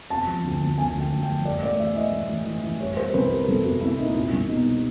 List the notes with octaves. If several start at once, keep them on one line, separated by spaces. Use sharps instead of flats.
C3 A5
F3
D2
D2
D2 G#5
D2
G5
D2
G5
F3
G3 D5
A2 D5
E3 E5
E3 D#5
A2
E3
E3
E3
G3 C#5
G3 C5
C2 B4
G3 A#4
C2 A4
C2 F#4
C2 E4
A#2 D#4
C2
C2
B2 D#4
G3